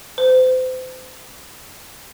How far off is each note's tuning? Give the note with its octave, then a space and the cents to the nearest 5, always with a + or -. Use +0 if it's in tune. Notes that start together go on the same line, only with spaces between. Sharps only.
C5 -35